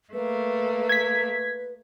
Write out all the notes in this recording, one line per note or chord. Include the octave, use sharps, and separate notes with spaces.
A3 A#3 B4
G#6 B6